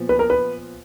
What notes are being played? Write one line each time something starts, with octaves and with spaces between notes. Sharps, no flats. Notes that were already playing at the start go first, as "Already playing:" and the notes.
Already playing: A#2 F3 B3
B4
A#4
B4